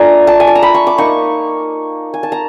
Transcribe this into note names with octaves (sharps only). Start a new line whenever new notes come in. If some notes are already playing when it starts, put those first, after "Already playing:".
Already playing: A3 D4 F4 G#5 A#5
A5
G#5
A5
A#5
B5
C#6
D6
A#3 D#4 C#6
G#5
A5
A#5